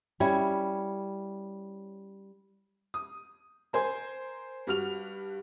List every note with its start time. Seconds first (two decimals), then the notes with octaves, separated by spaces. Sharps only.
0.20 G3 C#4 E4 C#5
2.94 D#6
3.73 A#4 C5 G#5 C6
4.67 G2 F#4 F6 F7